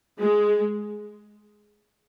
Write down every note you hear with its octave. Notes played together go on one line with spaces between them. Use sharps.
G#3